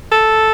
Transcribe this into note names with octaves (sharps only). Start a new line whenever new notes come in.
A4